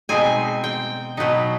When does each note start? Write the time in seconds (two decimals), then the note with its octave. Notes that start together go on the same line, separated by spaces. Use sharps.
0.09 B2 G#3 C4 D#4 G#5
0.64 G5
1.17 B2 F#3 B3 D#4